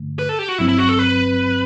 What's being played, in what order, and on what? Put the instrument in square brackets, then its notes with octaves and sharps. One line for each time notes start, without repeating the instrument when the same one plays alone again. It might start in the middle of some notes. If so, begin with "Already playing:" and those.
Already playing: [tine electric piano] G2 D3 A3
[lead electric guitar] B4
A4
G4
F#4
[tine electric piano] G1 G2 F#3 C4 [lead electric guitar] E4
[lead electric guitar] E4
F#4
A4
B4